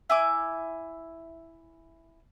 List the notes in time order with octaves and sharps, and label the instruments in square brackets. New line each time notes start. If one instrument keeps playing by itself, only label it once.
[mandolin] E4 G#5 D6